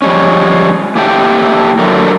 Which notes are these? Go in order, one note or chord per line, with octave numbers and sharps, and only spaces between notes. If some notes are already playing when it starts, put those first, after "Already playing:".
F3 G3 G#3 C#4
A#3 E4 G4 A4 E5 G5
D3 F#3 A3 A#4